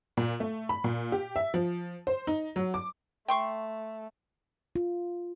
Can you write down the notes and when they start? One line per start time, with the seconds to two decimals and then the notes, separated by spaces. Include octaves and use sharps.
0.17 A#2
0.40 A3
0.69 B5
0.84 A#2
1.12 G4
1.36 E5
1.54 F3
2.07 C5
2.27 D#4
2.56 F#3
2.74 D6
3.28 A3 G5 C6 C#6
4.76 F4